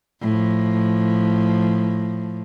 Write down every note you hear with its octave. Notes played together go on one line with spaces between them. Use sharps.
A2 F3